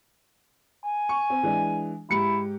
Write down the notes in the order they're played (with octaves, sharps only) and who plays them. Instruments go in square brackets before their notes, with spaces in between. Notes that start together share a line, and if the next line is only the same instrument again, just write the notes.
[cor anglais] G#5
[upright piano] C#6
C4
E3 G#3 D4
[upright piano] G#2 G4 C#7 [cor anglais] E4